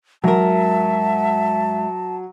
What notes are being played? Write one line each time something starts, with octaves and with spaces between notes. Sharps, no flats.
G#2 F#3 A#4 E5 A5